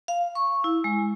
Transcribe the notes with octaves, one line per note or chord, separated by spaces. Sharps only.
F5
C#6
E4
G#3